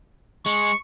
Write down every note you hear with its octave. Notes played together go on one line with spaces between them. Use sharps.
G#3 C#6